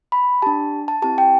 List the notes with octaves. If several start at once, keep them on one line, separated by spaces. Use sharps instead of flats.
B5
D4 G4 A5
A5
C4 E4 G4 A5
G5